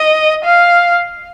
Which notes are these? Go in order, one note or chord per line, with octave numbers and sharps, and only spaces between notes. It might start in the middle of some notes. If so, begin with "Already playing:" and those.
Already playing: D#5
F5